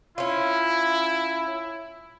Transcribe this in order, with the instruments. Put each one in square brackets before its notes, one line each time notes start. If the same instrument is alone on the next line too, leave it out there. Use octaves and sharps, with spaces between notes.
[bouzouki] C#4 F4 [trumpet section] E4